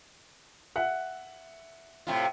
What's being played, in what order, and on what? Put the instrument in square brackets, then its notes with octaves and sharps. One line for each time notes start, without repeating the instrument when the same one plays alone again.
[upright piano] E5 F#5 F#6
[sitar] A2 C3 F4